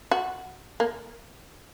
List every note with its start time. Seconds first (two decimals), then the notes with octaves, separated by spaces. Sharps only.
0.11 F#4
0.80 A#3